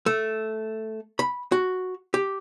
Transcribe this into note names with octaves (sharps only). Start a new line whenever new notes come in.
A3
B5
F#4
G4